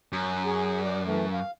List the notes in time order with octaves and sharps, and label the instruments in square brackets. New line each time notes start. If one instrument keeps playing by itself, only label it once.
[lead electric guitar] F#2
[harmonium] G#4
D5
E3 A3
F5